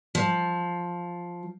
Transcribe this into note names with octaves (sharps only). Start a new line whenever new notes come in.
F3